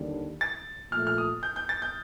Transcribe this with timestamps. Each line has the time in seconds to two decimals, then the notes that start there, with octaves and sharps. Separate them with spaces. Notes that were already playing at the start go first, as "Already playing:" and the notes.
Already playing: D#2 D3 G3 D4
0.41 A6
0.92 A#2 F3 A3 F6
1.07 F6
1.18 D#6
1.43 G6
1.56 G6
1.69 A6
1.82 G6